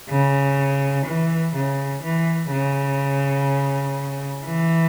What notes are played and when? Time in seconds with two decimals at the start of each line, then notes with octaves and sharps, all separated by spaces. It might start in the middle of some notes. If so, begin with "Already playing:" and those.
0.10 C#3
1.06 E3
1.55 C#3
2.03 E3
2.52 C#3
4.45 E3